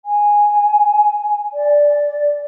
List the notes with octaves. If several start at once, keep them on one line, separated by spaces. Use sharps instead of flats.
G#5
D5